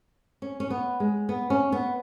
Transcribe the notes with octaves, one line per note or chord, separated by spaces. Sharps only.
C#4
C#4
B3
G#3
B3
C#4
B3